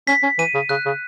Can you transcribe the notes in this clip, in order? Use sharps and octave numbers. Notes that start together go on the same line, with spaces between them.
C#4 B6
C#4
E3 D#7
C#3
C#3 F#6
C#3